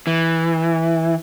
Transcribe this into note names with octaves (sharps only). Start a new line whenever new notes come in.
E3